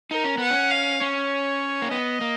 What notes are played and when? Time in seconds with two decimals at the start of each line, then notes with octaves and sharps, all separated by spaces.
0.11 D#4 A#4
0.24 C#4
0.38 B3 F#5
0.51 C#4
0.71 F5
1.01 C#4 C#5
1.82 A#3
1.91 B3 D#5
2.21 A#3